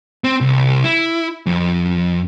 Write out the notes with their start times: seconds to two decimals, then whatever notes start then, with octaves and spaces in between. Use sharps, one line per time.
0.24 C4
0.41 C2
0.84 E4
1.46 F2